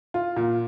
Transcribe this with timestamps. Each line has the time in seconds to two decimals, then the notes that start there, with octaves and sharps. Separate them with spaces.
0.14 F4
0.36 A#2